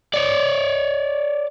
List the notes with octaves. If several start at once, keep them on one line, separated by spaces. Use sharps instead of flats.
C#5 D5